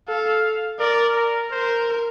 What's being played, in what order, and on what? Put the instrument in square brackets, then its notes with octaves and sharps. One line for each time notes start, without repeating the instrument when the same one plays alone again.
[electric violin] A4 [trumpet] F5
[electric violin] A#4 [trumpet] D5
[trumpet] A#4
[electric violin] A#4 [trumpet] C5